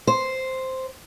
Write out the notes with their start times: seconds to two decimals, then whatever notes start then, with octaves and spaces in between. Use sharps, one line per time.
0.07 C5